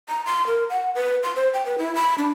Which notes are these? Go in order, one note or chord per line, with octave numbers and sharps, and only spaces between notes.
A#5
C6
A#4
F#5
B4
C6
C5
G5
B4
E4
B5
D4